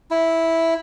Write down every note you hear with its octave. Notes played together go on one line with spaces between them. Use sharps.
E4